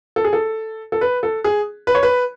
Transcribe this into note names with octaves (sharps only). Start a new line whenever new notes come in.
A4
G#4
A4
A4
B4
A4
G#4
B4
C#5
B4